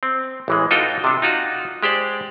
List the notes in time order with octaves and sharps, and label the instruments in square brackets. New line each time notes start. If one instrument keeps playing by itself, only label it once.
[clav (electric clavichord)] C4
A1 E3 G#3
D#4 F4 F#4 A4 D#5 G5
C3 D4
D#4 F4 F#4
G#3 G4 C5 D5